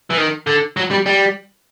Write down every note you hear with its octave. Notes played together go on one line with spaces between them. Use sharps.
E3
D#3
D3
F#3
G3
G3